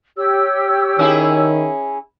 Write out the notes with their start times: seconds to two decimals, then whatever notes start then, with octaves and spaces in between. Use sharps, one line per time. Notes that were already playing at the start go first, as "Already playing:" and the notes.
0.17 G4 C#5 E6
0.99 D#3 C#4 E4 G#4